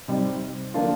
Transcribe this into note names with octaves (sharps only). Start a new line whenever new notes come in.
C3 G3 C4 D#4
D3 F3 A#3 D4 F4